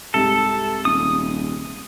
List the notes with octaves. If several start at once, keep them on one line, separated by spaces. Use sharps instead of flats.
C2 G#2 C3 A4
D#1 D#6